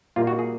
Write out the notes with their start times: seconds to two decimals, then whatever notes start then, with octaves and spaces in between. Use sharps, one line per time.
0.16 A#2 G3 A#3 F4
0.27 F#4
0.39 G#4